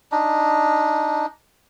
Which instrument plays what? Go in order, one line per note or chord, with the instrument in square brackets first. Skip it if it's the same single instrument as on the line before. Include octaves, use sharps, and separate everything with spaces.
[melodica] D4 D#4